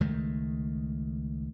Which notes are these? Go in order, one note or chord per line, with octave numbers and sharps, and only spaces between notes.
C#2 D#3 G#3 A3